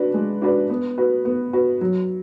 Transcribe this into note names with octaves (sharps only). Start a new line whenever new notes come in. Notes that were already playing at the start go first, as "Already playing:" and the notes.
Already playing: D4 F#4 B4 D5
G#3
D4 F#4 B4 D5
B3
F#4 B4
B3
F#4 B4
F#3